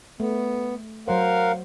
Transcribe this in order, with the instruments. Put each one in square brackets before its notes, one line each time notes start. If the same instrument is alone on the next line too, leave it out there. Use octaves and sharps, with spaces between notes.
[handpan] A3 [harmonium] B3
[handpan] F#3 C5 [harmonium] A#4 F5 F#5